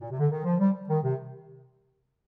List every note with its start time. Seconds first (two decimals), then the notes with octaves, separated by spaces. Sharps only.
0.01 A#2
0.10 C3
0.19 D3
0.30 D#3
0.44 F3
0.59 G3
0.89 D#3
1.03 C3